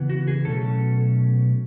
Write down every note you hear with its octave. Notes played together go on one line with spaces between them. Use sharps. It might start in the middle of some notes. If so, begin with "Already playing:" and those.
Already playing: C#3 E3 B3
F#4
G#4
B2 F#3 A3 C#4 A4